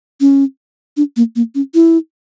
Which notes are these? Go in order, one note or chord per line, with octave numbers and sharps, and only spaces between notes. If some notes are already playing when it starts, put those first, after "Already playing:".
C#4
D4
A#3
A#3
C#4
E4